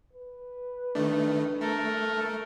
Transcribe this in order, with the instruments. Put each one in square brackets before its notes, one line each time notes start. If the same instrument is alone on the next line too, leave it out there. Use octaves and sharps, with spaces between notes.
[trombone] B4
[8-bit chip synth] D#3 A3 [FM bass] D4
[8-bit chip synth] A3 [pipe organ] A4 A#4